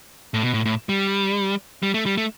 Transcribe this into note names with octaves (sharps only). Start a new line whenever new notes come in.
A2
B2
A2
A2
G3
G3
A3
G3
A3